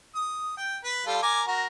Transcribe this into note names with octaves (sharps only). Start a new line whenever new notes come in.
D#6
G5
B4
G3 F4 A4
A#4 G#5 D6
F#4 A#4